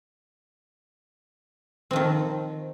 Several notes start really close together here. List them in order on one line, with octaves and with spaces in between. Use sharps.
C4 F3 D#3